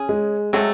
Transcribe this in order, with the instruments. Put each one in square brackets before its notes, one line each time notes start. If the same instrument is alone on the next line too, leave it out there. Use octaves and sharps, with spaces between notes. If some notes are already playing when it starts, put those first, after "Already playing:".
Already playing: [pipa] C#3 C#4 G#4
[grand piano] G#3
[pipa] C3 F#3 A3 [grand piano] G#3